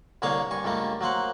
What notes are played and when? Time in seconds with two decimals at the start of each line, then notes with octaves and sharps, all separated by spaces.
0.22 C2 D3 A#3 G#4 C#5 F5
0.51 G2 G#5 C#6
0.64 C#2 G2 A3 A#3
1.01 F#3 A#3 C5 F#5